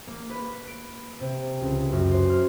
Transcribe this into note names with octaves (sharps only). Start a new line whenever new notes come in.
A#3
B4
D7
C3
C#2
F#2
C5
F6